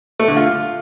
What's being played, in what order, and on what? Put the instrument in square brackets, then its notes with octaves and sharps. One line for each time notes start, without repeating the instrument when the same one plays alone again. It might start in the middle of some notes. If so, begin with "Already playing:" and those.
[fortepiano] A3
D3
F4